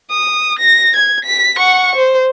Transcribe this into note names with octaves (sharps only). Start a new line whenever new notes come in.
D#6
A#6
G#6
B6
F#5 C#6
C5